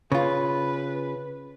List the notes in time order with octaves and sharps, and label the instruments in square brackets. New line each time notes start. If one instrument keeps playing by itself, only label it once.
[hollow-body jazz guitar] C#3 F4 [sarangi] B4